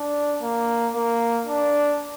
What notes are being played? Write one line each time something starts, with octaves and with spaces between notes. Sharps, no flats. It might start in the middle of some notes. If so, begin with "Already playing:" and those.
Already playing: D4
A#3
A#3
D4